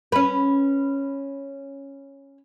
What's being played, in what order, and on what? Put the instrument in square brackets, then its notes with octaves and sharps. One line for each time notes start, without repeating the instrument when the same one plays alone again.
[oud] C#4 B4